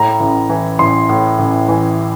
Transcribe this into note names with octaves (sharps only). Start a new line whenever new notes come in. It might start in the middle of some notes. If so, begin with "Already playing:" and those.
Already playing: A2 A#5
A1
E3
A1 C6
A2
A1
E3